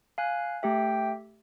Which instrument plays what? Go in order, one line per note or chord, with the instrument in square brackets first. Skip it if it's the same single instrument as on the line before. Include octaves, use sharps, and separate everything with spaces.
[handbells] F5 G#5 F#6
[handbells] A3 G4 E5 [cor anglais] G5